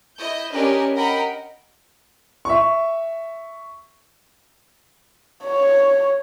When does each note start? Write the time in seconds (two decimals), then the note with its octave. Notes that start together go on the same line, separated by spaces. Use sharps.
0.18 E4 D#5 G6
0.52 C#4 D4 G4 A#4 B4 D#5
0.96 A#4 D#5 F#5 G5 A#5 B5
2.45 E5 C#6
5.44 C#5